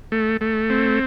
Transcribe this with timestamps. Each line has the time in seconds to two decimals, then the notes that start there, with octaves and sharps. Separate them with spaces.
0.12 A3
0.41 A3
0.70 C4